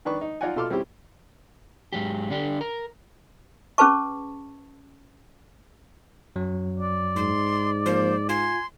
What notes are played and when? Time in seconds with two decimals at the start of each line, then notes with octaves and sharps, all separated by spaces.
0.05 D#3 D4 B4 C#6
0.21 D#4
0.41 D#4 F4 D5 D#5 F#5 G#5
0.56 B2 F4 A4 C6 D6 F6
0.70 G3 C4 C#4 E4 G4
1.93 G#2 F#3 G4
2.30 D3 D4 G4
2.61 A#4
3.78 C#4 G#4 B4 A5 C#6
6.36 F#2 F#3
6.79 D5
7.16 G#2 C6
7.86 F3 A#3 C5
8.29 F4 G#5 C6